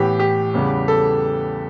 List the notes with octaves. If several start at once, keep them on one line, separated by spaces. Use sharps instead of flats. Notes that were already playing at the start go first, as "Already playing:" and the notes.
Already playing: A2 E3 B3 G4
G4
E2 C#3 G3 B3
A4